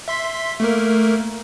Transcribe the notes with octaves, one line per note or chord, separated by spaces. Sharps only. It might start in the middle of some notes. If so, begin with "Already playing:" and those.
E5 C6 B6
A3 A#3 A#4